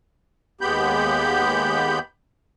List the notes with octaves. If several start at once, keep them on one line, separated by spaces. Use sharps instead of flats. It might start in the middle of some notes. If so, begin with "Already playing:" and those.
D#2 G#3 B3 G4 B5 G6